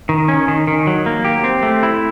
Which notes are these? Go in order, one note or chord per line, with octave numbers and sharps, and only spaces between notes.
D#3
C#4
D#3
D#3
F#3
A#3
G4
C4
A3
E4